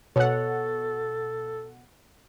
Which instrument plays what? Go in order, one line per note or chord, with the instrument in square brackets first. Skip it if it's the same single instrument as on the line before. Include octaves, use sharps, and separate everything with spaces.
[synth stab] B2 F#5 [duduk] A4 [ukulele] C#5